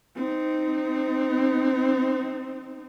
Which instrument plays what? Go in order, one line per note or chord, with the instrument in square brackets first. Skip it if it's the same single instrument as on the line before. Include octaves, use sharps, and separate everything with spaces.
[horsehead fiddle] C4 D#4